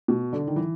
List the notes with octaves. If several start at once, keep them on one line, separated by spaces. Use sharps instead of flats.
B2
D3
D#3
E3